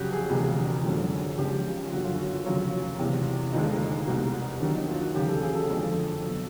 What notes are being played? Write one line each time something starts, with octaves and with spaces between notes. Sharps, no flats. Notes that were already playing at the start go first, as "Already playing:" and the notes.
Already playing: F2 C#3 F#3 F#4 G4
G#4
E1 D2 C3 F3 G#3 G#4
G#1 F#2 D3 F3 G#3
C#2 C#3 F3 G#3 G4
F4
G1 F#2 D3 F#4
F4
F#4
F4
F1 D#2 C#3 F#3 F4
E2 C3 E3 G#3
F1 D#2 D3 F3 G#3 D#4
C2 B2 G#3
D#2 D#3 F#3 D4
D#4
F4
F#4
E1 D#2 C#3 F#3 G4
A4
G#4
A4
F#1 F2 D3 F3 G#3
B2 F#3